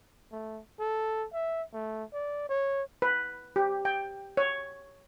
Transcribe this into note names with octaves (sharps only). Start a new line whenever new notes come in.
A3
A4
E5
A3
D5
C#5
B4
G4
G5
C#5